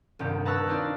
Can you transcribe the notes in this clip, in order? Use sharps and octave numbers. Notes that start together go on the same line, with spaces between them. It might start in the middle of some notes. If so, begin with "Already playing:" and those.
D#1 C2 G2 G4
B4 A5 A#5 C#6 E6 F#6
C4 D4 D#4 F4 D5